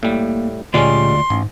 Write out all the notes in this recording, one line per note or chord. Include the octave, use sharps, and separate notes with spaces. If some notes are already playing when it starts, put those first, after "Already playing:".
A2 G3 A#3
D2 A#2 G3 G#3 C#4 F4 D5 C6
A1 G#2